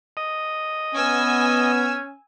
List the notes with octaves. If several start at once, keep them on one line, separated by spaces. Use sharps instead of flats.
D#5
B3 C#4 G#5 E6